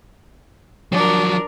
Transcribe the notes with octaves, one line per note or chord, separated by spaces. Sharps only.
F3 F#3 D4 A#4